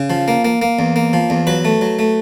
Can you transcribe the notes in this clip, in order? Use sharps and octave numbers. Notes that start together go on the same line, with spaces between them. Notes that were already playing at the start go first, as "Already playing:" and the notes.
Already playing: C#3
F3
A#3
A#3
A#3
E2
A#3
F3
E2
F#3 B4
A3
F#3
A3